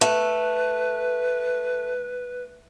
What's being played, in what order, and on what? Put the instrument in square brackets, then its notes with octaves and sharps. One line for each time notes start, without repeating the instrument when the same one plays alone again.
[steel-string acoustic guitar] A3 [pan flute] B4